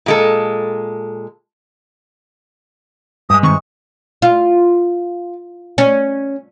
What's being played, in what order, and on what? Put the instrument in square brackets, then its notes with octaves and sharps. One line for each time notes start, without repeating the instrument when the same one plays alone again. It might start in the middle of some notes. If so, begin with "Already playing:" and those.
[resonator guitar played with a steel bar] A#2 G#3 A4
[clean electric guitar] G2 G#3 [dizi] D#6
[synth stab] G#2 C3 D#3 [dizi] C#6
[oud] F4
C#4